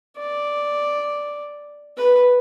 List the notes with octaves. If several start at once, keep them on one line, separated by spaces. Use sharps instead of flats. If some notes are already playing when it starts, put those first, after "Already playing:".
D5
B4